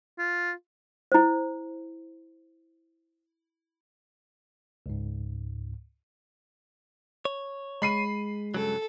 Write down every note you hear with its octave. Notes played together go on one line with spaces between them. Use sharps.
F4
E4 C5
C#2 G#2
C#5
G#3 B5 C7 D#7
G2 C#3 F#3 A4